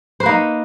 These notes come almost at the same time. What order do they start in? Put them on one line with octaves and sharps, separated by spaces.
C5 B4 A#3 D#4